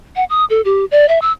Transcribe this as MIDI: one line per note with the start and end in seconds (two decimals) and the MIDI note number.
0.16 0.24 78
0.30 0.45 87
0.50 0.61 69
0.65 0.85 67
0.91 1.08 74
1.08 1.19 76
1.22 1.32 88